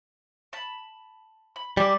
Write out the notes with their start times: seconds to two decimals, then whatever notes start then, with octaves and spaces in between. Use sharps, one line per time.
0.53 A5 B5
1.56 B5
1.77 G3 G#5 D6 E6